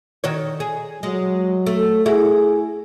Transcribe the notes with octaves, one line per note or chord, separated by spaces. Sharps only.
D#3 F#4 C#5
G#4
F#3 G#3
A3
E4 F#4 G#4